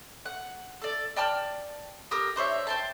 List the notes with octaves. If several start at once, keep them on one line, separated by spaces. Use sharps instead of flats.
F#5
A4 D5
D5 G5 A5 F6
G4 A#4 D#6 E6
D4 C5 C#5 E5
C5 G5 A5